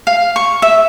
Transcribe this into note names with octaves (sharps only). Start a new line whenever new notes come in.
F5
C#6
E5